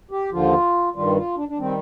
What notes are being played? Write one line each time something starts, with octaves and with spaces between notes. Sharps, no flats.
G4
D#2 D3 F3 F4
G2 D#3 G3 F4
F4
D4
D4
D#3 G3 C4